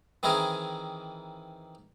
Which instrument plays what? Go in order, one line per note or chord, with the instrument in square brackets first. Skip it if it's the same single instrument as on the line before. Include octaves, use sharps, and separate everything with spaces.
[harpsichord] D#3 E3 C4 E4 G#4 A#4